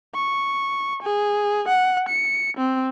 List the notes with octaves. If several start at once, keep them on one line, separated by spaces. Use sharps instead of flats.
C#6
G#4
F#5
C#7
C4